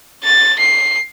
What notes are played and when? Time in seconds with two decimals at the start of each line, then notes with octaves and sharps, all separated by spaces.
0.24 A6
0.59 C7